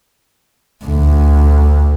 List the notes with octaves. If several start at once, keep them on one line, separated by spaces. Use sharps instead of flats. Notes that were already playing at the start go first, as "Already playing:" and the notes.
D2